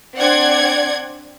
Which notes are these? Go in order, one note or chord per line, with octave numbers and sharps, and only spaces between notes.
C4 D4 D5 F#5 G#6